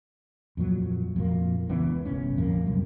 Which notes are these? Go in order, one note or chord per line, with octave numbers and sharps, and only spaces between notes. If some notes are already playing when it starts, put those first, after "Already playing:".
F2 A#2 F#3
F2 A#2 A#3
C#2 E3 B3 D4
G1 C2 C#4
A#1 F2 A#3
C2 F#2